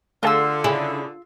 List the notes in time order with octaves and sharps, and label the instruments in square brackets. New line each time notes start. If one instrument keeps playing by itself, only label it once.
[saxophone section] D3 [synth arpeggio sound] A3 G#4 A4 [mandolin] F4 E6
[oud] C#3 E4 [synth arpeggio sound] G#4